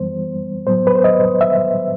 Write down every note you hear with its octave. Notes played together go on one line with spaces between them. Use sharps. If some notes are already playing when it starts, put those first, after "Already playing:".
Already playing: F#2 E3 G3 B3 C5
A2 F#3 B3 C5
B4
C5
D#5
E5